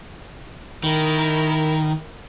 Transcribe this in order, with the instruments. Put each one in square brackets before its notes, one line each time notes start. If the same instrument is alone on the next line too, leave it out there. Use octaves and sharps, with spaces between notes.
[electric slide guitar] D#3 [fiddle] E4 A#4